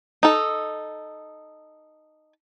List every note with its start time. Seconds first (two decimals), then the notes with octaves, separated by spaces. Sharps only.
0.23 D#4 A4